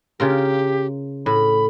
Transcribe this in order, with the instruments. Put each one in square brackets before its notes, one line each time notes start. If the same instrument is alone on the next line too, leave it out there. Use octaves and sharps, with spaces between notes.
[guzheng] C#3 F4 A#4 [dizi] G4
[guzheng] A2 [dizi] B5